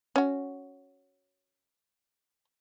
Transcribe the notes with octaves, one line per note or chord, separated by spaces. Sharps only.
C#4 F#4